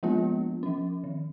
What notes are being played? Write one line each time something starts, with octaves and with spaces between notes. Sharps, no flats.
F3 G#3 A#3 B3 D4 F4
F3 C#4
D#3